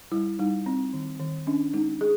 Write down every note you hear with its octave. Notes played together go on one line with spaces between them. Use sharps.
G3 E4
G3 D#4
C4
D#3
D#3
C#4 D4
G#3 D#4
G#3 G#4